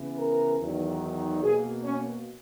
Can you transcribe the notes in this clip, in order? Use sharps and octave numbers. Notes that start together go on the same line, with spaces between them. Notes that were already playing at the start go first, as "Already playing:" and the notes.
Already playing: C#3 E3 B3
A#4
E2 D#3 F#3
B2 A#3 G#4
C#4